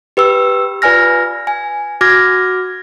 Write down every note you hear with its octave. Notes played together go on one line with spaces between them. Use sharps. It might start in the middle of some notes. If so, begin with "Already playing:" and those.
G4 B4 G5 E6
F4 B4 D5 G#5 F6 A#6
G#5
F#4 D6 F6 G#6 A#6